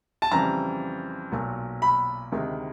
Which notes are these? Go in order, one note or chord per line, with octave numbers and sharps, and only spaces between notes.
A5
F2 C#3 E3 G3 A#5
B1 A#2 F#3
B5
D2 C3 D#3 G#3